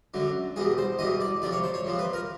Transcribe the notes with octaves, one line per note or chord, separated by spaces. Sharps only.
F#2 D3 F#3
E2 B2 G3 G#4
C5
E2 B2 G3 D#5
D5
F2 C3 F3 D5
C#5
C5
C#5
F2 C3 F3
B4
A#4